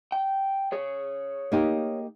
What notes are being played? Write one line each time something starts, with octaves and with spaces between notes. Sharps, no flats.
G5
G#4 C#5
A#3 D#4 G4